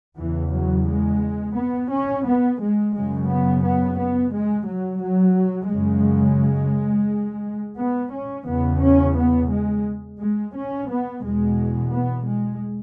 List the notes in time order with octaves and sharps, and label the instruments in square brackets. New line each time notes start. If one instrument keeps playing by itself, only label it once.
[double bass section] E2 C#3 E3
F#3
G#3
B3
C#4
B3
G#3
F#2 C#3 G#3
B3
B3
B3
G#3
F#3
F#3
F#2 C#3 G#3
B3
C#4
E2 C#3 B3
C#4
B3
G#3
G#3
C#4
B3
E2 B2 G#3
B3
G#3